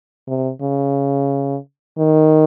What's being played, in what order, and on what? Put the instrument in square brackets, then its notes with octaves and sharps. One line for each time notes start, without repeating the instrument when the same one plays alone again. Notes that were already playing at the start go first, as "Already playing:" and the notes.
[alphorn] C3
C#3
D#3